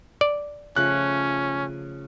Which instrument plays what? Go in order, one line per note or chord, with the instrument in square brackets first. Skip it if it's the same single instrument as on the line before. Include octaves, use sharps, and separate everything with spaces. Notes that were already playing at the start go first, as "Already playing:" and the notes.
[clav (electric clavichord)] D5
[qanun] C#3 F3 A3 [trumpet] C#4 [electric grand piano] F#6